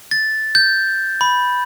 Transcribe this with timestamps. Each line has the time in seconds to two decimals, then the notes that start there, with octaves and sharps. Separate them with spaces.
0.11 A6
0.55 G6
1.21 B5